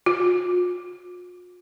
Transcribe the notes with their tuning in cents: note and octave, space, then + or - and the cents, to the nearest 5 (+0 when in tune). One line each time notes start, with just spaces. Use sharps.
F4 +40